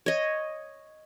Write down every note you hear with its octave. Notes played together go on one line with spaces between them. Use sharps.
C#5 D#5